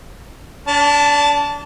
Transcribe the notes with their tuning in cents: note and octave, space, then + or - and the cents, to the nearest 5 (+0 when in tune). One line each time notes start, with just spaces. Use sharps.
D4 -35 A5 +0